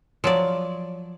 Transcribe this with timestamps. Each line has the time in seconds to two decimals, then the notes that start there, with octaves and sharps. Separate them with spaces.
0.24 F3 F#3 C#5 D5